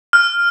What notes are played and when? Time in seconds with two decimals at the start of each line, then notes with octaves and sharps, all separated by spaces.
0.13 F6